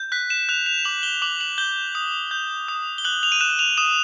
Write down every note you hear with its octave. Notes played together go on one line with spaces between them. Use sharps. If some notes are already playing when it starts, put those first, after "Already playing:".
Already playing: G6
F#6 B6
E7
F#6 F7
F7
D6 F#7
G7
D6 F#7
F#7
G6 G7
D#6
G6
D#6
G7
F#6 F#7
F7
D#7
F#6 E7
F7
D#6 E7